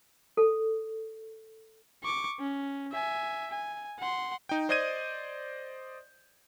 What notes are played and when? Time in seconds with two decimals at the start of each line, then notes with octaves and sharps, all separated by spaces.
0.37 A4
2.03 C#6 D6
2.39 C#4
2.91 E5 G#5
3.51 G#5
3.99 F#5 C6
4.49 D#4 G5
4.69 C5 D5 D#5 G6 G#6 D#7